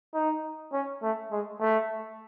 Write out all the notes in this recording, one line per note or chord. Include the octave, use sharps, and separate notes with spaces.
D#4
C#4
A3
G#3
A3